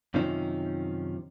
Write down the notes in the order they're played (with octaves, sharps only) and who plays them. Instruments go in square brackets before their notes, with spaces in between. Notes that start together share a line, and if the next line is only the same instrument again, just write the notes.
[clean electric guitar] F#2 C3 D#3 F3 C#4 D#4